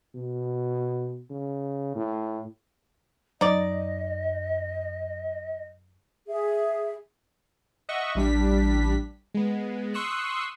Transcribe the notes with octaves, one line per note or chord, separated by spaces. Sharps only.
B2
C#3
A2
F#2 D#4 D5 D#5
G#4 E5
D#5 E5 F#5 C#6
A1 G3 D4 B6
G#3 B3
C6 C#6 D#6 E6 F#6